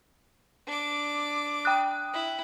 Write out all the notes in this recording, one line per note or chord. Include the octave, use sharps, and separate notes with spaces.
D4 D6
G5 D#6 F#6
E4